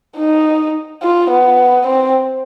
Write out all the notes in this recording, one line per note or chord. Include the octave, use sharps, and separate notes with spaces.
D#4
F4
B3
C4